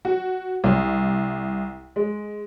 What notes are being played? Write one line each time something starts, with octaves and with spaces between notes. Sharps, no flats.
F#4
C2
G#3